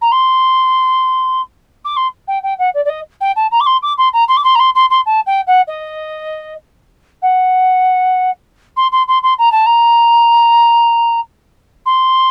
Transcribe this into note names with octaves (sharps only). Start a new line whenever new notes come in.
A#5
C6
D6
C6
G5
G5
F#5
D5
D5
D#5
G5
A5
A#5
D6
C6
D6
C6
A#5
C6
D6
C6
A#5
C6
C6
C6
A5
G5
F#5
D#5
F#5
C6
C6
C6
C6
A#5
A5
A#5
C6